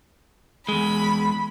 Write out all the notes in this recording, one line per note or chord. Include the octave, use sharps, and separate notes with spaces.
E2 G#3 B5